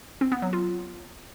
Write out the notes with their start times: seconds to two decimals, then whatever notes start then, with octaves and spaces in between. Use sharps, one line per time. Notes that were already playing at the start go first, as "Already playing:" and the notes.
0.21 C4
0.32 B3
0.42 F#3
0.53 F4